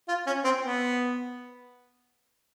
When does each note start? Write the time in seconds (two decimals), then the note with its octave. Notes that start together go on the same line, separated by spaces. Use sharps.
0.08 F4
0.26 C#4
0.44 C4
0.63 B3